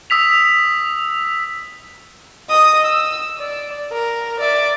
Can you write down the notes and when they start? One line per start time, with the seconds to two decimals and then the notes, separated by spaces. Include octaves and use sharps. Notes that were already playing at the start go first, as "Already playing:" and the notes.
0.10 D#6 E6 B6 F7
2.50 D#5 D#6
2.85 E6
3.38 D5
3.92 A#4
4.41 D5 E5